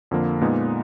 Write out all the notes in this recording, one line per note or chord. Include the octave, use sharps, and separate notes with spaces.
F2 D3 F3 A#3
A#2 G#3 B3 D#4